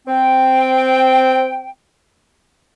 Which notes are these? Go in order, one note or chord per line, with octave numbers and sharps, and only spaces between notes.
C4 G5